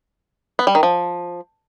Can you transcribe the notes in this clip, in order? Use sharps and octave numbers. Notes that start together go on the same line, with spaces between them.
B3
G3
D#3
F3